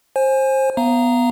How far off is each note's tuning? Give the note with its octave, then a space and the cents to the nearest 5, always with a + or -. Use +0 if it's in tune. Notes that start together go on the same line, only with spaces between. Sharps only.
C5 +25 G#5 +0
B3 +0 F5 -30 A#5 +0